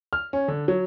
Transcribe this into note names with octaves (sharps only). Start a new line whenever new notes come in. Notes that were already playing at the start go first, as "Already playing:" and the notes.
F6
C#4
D3
F#3